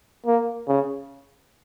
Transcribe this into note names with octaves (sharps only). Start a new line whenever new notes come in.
A#3
C#3